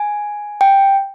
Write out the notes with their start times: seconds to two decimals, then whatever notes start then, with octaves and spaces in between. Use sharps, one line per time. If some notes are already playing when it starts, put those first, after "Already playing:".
Already playing: G#5
0.61 G5